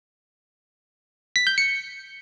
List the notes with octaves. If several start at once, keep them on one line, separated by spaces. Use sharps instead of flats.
B6
G6
C#7